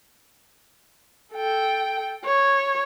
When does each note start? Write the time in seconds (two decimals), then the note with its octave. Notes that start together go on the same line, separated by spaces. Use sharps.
1.34 A4 G5
2.25 C#5